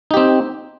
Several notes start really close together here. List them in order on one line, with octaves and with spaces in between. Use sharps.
D#4 G4 C4